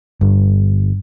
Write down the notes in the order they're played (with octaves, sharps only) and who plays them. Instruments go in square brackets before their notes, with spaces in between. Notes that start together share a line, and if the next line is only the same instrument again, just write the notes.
[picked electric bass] G1 [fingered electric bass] G2